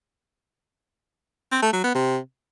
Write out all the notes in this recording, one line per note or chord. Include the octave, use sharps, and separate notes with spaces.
C4
A3
F#3
B3
C3